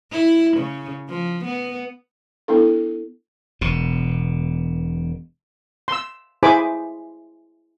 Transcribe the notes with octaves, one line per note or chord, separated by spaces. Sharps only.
E4
C#3
F3
B3
B3 D4 E4 A4
E1 B2
C6 E6
E4 G#4 C5 G#5 B5 D6